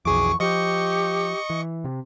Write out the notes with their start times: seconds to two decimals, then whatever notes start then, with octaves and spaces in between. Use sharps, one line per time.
0.05 B1 F2 E3 G#4 C#6 D6
0.40 F3 G4 D#5 C#6 C#7
1.50 E3
1.84 C3